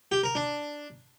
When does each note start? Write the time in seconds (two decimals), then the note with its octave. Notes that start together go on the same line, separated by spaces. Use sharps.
0.12 G4
0.23 A#4
0.35 D4